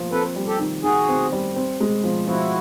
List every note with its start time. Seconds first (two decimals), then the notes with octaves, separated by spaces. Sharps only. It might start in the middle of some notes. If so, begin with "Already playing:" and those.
Already playing: F3 A#3
0.12 C4 A4 B4
0.36 G3
0.47 G4 A4
0.60 D#3
0.83 D#3 F#4 G#4
1.08 C4
1.32 G3
1.56 C4
1.80 G#3
2.04 F3
2.27 F3 E4 F#4